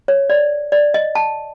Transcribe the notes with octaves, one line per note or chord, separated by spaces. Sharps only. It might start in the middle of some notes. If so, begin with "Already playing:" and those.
C#5
D5
D5
D#5
A5